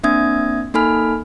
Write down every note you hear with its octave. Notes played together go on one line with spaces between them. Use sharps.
A#3 C4 D4 E5 D#6 G#6
A#3 D#4 A4 G#5 B5 F6